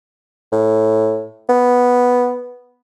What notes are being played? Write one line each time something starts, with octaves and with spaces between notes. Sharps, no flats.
A2
B3